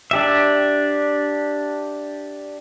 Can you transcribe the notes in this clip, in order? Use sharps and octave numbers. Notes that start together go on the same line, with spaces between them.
D4 G4 E5